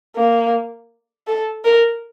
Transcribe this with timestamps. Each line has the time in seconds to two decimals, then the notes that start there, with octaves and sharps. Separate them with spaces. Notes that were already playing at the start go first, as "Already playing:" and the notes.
0.16 A#3
1.27 A4
1.64 A#4